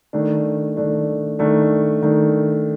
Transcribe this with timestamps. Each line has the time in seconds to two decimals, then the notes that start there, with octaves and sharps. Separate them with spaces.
0.13 D#3 A3 D4
0.77 D#3 A3 D4
1.39 D#3 A3 D4
2.02 D#3 A3 D4